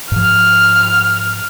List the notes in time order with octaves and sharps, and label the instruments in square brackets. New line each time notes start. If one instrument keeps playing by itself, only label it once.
[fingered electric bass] G#2 F3 [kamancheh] F6